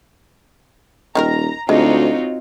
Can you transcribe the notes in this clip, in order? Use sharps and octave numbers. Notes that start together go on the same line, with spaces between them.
D#1 D#3 D#4 A#4 A#5
D2 G#3 C4 D#4 F4 F#4 C#5